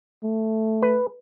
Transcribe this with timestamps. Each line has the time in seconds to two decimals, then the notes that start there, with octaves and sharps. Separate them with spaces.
0.24 A3
0.82 B4